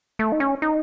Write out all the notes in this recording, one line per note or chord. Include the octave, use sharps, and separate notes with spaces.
A3
D#4
C#4
D#4